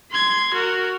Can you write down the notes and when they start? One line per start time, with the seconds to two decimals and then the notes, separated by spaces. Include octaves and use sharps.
0.11 C6 G#6
0.54 F#4 A#4